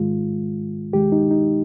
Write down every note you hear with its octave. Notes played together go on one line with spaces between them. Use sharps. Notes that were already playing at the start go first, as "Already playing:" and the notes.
Already playing: G#2 D#3 G#3 F4
D#2 D#3 G#3 G4
D#4
D#4